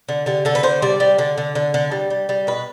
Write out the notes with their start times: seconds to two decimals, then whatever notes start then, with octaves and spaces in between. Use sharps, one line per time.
0.09 D3
0.26 D3 G4
0.45 D3 A4
0.55 B4
0.63 D3 C5
0.82 G3 D5
1.00 G3
1.19 D3
1.38 D3
1.55 D3
1.74 D3
1.91 G3
2.10 G3
2.29 G3
2.47 B2 B4